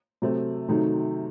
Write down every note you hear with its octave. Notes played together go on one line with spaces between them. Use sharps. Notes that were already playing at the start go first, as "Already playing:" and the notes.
C3 F#3 A3 C4
C3 D#3 F#3 A3 D#4